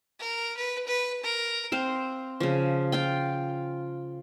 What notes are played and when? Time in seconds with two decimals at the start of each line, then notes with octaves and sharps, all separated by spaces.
0.19 A#4
0.57 B4
0.87 B4
1.23 A#4
1.72 C4 C5 F5
2.40 C#3 F3
2.92 F4 F5 G5